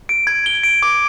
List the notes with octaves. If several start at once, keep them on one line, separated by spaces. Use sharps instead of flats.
D7
G#6
G7
D7
D6